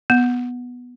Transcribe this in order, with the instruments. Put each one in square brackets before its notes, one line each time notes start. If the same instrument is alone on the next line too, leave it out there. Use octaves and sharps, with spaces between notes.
[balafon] B3